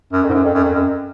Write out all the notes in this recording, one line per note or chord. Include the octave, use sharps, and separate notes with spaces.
F#2
F2
G#2
F#2
F2
F#2
F2
F#2